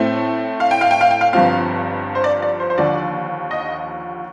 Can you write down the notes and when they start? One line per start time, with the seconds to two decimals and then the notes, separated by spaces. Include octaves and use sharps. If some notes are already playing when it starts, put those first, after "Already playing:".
Already playing: A2 A3 C4
0.60 F5
0.71 G5
0.81 F5
0.91 G5
1.01 F5
1.11 G5
1.21 F5
1.33 G1 G2 F3 C4 F5
2.15 C5
2.24 D5
2.42 D5
2.60 C5
2.70 C5
2.78 D#2 D3 F3 D5
3.51 D#5